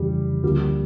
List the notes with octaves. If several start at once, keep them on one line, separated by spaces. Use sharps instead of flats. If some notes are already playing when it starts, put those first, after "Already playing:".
Already playing: F2 C#3 E3 G3
D2 D3 F3 G3 A#3